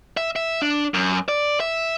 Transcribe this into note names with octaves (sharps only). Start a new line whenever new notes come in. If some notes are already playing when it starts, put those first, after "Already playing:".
E5
E5
D4
F#2
D5
E5